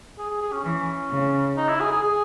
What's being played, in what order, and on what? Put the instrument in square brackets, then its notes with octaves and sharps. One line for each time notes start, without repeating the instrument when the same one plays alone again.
[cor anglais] G#4
G#4
G#4
C#4
[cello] E3 [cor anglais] C#4
[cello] C#3
[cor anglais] D#4
E4
G#4
G#4
G#4